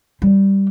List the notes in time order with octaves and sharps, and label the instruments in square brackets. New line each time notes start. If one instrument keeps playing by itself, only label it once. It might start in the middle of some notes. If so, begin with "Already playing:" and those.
[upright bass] G3